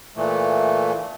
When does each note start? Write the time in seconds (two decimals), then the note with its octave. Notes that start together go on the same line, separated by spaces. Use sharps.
0.16 A#2 E3 A3